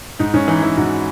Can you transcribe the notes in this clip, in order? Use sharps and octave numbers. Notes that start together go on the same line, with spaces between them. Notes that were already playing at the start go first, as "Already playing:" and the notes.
G#2 D#4
G#2 C#4
E3 D#4
E3 E4
G#2 F#4